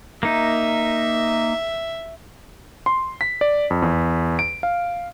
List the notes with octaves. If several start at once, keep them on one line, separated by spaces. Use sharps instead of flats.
A#3 D#4 E5
C6
B6
D5
F2
E2
D7
F5